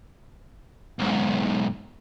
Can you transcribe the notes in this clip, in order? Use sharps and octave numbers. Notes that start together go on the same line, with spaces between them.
B1 G#2